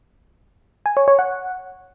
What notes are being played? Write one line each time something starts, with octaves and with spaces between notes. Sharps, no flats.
G#5
C#5
C#5
F#5